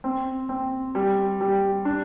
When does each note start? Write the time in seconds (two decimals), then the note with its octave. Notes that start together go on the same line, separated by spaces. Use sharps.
0.04 C4
0.49 C4
0.95 G3
1.41 G3
1.85 D4